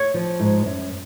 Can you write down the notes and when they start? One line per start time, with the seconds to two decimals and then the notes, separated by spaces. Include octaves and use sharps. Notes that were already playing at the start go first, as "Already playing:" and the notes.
Already playing: C#5
0.14 F3
0.40 G#2
0.66 F#2